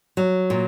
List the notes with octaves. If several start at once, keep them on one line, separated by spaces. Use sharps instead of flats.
F#3
A#2